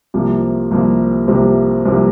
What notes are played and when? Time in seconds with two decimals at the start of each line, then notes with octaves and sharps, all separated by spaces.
0.14 C2 C3 F3 A#3
0.71 C2 C3 F3 A#3
1.28 C2 C3 F3 A#3
1.85 C2 C3 F3 A#3